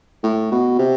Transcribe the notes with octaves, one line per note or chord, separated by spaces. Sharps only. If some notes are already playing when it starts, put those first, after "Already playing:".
A2
B2
C3